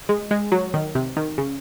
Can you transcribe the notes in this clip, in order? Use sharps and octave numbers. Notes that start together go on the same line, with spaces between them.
G#3
G#3
F#3
D#3
C3
D#3
C#3